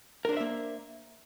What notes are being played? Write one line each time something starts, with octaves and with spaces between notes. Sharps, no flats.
A#3 D4 A#4 C5 E5